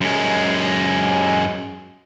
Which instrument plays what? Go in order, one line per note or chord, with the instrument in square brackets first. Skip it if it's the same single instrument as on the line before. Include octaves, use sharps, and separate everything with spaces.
[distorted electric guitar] F#2 G#3